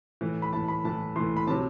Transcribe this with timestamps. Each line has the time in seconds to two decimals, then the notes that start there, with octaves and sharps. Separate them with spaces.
0.21 A2 E3
0.42 B5
0.53 A2 E3 A5
0.68 B5
0.84 A2 E3 A5
1.16 A2 E3 C6
1.37 B5
1.47 C3 A5
1.51 F#3